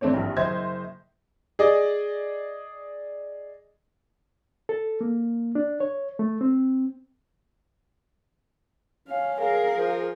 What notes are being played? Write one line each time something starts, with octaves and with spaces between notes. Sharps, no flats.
E3 A3 C4 D4 C#5
A#1 G2
F#1 C5 D#5 E5 G#6
G#4 D5 D#5
A4
A#3
D4
C#5
A3
C4
C#4 F5
G#4 A#4 F5
F3